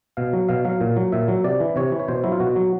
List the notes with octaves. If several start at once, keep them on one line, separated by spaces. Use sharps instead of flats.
B2 F5
F#3
B2 F5
F#3 F5
A#2
F#3
A#2 E5
F#3
C3 D5
E3
C3 C#5
E3
C#5
B2 C5
F#3 E4
F4
B2 F#4
F#3